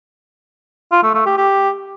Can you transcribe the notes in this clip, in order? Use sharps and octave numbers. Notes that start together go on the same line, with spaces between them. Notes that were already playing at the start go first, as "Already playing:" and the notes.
F4
A3
A3
G4
G4